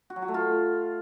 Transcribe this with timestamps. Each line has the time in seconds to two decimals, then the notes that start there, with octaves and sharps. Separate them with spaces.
0.10 F#4
0.16 F#3
0.22 F#4
0.28 A3
0.34 F4